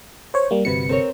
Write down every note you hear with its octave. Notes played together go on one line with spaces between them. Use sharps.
C5 C#5
G3 A#3
G1 C3 F#4 B4 C#7
C4 A#4 C#5